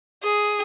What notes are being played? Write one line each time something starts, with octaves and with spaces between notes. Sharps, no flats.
G#4